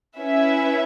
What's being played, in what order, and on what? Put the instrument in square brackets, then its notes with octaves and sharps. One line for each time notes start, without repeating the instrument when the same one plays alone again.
[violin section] C#4 E4 B4 E5